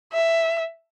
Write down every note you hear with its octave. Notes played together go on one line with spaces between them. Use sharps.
E5